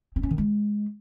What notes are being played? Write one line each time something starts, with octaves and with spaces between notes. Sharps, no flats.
C4
C#4
D#3
G#3